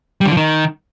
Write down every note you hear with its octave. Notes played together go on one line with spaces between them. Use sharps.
G3
D3
F3
D#3